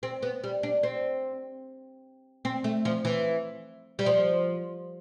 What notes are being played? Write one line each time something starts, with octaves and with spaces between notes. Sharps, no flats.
C4
B3
G3
D4
C4
C4
A3
F3
E3
G3
F3